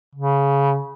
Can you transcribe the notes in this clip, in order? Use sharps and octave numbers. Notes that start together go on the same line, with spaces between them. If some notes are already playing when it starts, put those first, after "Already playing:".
C#3